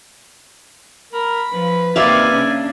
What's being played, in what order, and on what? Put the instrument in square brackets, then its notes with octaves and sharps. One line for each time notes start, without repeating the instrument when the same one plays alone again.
[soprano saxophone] A#4 [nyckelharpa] B5
[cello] F3 [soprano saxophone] B4
[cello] C3 D#3 [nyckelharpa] A#3 G#5 [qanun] D5 E5 F5
[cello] C#3 D4